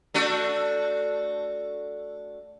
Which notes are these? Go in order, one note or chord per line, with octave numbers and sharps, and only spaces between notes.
A3 D4 F#4